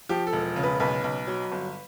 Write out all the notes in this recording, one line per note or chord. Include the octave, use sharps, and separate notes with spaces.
F3 G4
A4
E1
C#3
B4
B1 B4
B1
F#3
G1